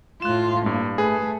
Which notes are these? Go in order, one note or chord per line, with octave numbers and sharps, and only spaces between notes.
A2 F4 F#6 E7
G2 A#3
A3 G#4 B4